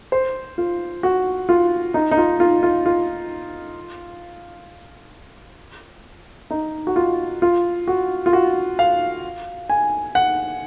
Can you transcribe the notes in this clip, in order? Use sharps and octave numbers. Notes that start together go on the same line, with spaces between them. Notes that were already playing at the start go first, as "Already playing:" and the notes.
C5
F4
F#4
F4
D#4
D#4
F4
F4
F4
F4
D#4
F#4
F4
F4
F#4
F4
F#4
F5
G#5
F#5